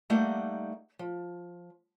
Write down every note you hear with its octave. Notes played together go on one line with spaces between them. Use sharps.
G3 A3 A#3 D#4 F#5
F3